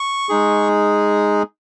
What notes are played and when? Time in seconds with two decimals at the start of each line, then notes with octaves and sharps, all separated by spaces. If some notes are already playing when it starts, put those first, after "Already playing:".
Already playing: C#6
0.29 G#3 D#4 G#4